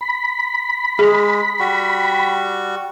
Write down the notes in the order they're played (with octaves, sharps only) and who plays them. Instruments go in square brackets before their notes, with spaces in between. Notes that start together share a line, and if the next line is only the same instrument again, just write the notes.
[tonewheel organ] B5
[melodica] G#3 [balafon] G#4
[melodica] G3 F#4